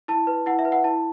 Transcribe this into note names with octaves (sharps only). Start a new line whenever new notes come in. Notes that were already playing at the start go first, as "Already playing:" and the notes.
E4 A5
B4
E4 F#5
E5
B4
F#5
E4 A5